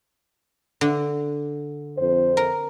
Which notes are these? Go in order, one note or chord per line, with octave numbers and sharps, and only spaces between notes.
D3
F2 C5
A#4